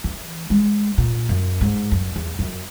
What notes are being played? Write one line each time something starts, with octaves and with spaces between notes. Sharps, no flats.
E3
G#3
A#2
F#2
G#2
F#2
E2
F#2